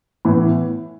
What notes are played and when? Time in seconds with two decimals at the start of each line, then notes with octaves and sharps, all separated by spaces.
0.25 A2 E3 B3